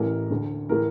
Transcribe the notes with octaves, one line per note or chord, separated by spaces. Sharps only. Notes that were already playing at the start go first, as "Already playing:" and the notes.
Already playing: A1 A2 E3 A#4
D2 D3
A2 E3 A#4